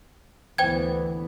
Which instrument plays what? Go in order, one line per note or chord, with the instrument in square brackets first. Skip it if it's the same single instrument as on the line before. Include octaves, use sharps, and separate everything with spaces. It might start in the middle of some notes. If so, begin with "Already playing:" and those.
[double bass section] D2 E3 B3 [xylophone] C5 G5 G#6